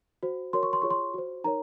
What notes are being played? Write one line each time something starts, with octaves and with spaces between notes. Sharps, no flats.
F#4 C5
F#4 A#4 C#5 C6
C#6
C6
F4 G#4 C#5 C#6
C6
F#4 C5
D#4 A#4 C#5 A#5